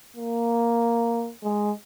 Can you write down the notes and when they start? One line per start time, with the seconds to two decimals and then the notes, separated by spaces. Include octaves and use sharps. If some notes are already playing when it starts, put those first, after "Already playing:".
0.16 A#3
1.43 G#3